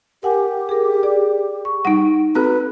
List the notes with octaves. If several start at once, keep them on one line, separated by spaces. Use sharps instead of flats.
G4 A#4 F#5 G#5
G#4 A#4
G#4 D5
C#6
G3 D#4 F#5
C4 F#4 A4 B4 F#6